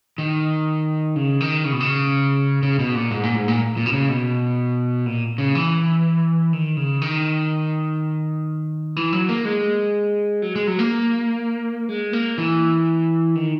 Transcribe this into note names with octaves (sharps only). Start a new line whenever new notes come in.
D#3
C#3
D#3
C#3
B2
C#3
C#3
B2
A#2
G#2
A#2
G#2
A#2
A#2
B2
C#3
B2
A#2
C#3
E3
D#3
C#3
D#3
E3
F#3
A#3
G#3
F#3
G#3
F#3
A#3
G#3
A#3
E3
D#3